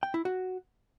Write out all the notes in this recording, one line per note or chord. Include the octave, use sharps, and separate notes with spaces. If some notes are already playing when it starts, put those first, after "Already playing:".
G5
E4
F#4